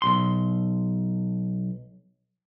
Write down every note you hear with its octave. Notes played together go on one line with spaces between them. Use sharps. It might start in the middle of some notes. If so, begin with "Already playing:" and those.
B1 F#2 C6